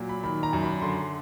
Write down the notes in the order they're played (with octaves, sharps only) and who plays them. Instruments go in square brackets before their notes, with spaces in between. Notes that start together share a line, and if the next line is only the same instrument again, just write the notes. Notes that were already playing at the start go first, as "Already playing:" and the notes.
Already playing: [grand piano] A#2 F#3
B5
D#3 B5
A#5
F#2
B5
D3 C6